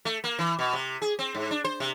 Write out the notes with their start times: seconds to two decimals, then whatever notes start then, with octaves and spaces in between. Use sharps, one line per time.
0.05 A3
0.24 A#3
0.39 E3
0.59 B2
0.73 C3
1.02 G#4
1.19 C4
1.34 G#2
1.51 D4
1.64 C5
1.80 C3